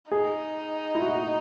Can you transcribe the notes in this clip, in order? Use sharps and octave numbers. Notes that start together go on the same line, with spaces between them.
D#4 G#4
E4
F#4